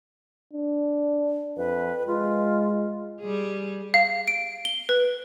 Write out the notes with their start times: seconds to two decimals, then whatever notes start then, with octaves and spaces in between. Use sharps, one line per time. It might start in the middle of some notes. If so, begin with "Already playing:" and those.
0.53 D4
1.57 F2 B4
2.07 G#3 F4
3.21 G3 G#4
3.94 F5
4.28 D7
4.65 G7
4.89 B4